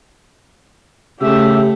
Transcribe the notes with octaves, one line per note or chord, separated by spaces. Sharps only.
C#3 A3 G4 E5